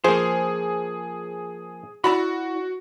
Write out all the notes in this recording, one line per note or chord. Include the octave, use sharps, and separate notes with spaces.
F3 A#3 G#4 C5
E4 F#4 D5 B5